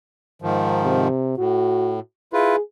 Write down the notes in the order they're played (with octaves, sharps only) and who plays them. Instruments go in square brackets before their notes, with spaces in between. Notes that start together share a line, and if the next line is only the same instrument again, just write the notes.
[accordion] G#2 D#3 F3
[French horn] C3
[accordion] A2 [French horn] F#4
[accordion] E4 F4 B4 [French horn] G#4